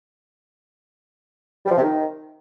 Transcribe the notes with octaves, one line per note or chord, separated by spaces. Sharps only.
G3
F3
C3
D#3